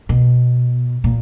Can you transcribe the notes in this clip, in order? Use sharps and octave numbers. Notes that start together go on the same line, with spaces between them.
B2
A#2